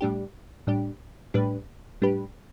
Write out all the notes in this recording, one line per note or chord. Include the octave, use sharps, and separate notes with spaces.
A2 G3 D4 G4
A2 G3 D4 G4
A2 G3 D4 G4 B4
A2 G3 D4 G4 B4